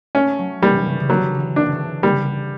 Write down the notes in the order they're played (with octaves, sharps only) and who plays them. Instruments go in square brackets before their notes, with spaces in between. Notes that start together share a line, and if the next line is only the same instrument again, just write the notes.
[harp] A3 [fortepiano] C#4
[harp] F#3
[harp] E3 [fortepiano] G3
[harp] C#3
C#3
[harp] D3 [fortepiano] F#3
[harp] D3
E3
[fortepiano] D4
[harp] D3
C#3
[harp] D3 [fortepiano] G3